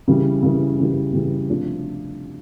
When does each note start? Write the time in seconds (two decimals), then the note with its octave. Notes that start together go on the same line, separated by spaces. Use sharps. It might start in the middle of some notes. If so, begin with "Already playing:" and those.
0.08 C#3 E3 G3
0.43 C#3 E3 G3
0.79 C#3 E3 G3
1.13 C#3 E3 G3
1.49 C3 F3 A3 D4 F4